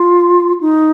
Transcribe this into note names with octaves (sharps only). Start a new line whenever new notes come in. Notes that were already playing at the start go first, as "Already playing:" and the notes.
Already playing: F4
D#4